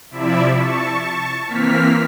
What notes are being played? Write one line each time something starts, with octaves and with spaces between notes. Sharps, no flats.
C3 F3 E4 D5 E5
A5 C#6
E3 A#3 C4 F6 B6